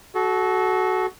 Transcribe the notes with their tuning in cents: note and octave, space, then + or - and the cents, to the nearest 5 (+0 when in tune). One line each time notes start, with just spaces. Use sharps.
F#4 +10 A4 -30